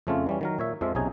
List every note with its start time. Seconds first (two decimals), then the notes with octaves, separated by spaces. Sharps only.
0.07 F2 C#3 A3 C4 C#4 F4
0.27 E3 G3 C#4
0.41 D#3 F#3 A#4
0.59 A#2 C#5 E5
0.81 F2 F3 G#3 F4 E5
0.95 B1 C3 C#4 D#4 G#4 G#5